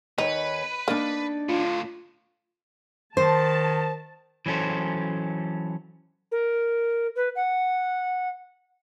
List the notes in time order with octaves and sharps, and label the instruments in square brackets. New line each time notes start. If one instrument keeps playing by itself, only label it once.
[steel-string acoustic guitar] D#2 C#5 [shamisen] D#4 [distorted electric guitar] B4
[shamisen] A#3 [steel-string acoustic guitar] D4 D#4 D5
[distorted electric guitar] A2 D3 [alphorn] F4
[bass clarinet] D#3 [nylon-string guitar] C5 [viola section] A5
[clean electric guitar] E3 F#3 C#4 A4 C5
[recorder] A#4
B4
F#5